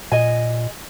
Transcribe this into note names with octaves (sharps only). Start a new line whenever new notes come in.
A#2 D#5 G#5